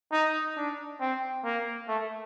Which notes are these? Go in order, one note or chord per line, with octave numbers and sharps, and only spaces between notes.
D#4
D4
C4
A#3
A3